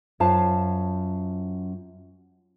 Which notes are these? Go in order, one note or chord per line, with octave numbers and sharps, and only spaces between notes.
F#2 F4 C5 A5